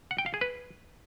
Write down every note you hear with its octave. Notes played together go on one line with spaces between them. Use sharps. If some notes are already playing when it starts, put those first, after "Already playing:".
F#5
G5
F5
G#4
B4